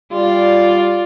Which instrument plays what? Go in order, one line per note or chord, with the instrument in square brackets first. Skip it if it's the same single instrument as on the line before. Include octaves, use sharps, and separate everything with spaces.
[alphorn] G3 [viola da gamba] F4 D5